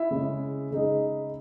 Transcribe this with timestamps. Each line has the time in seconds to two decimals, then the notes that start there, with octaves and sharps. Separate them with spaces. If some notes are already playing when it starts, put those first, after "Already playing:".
Already playing: E4 E5
0.11 C#3 G#3 C#4
0.71 C#3 G#3 D#4